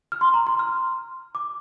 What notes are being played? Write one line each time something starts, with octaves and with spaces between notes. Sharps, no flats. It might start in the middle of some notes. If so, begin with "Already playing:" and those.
F6
C6
A#5
C6
F6
D6